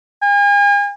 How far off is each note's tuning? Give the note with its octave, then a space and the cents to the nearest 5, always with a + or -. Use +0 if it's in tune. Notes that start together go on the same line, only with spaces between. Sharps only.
G#5 -40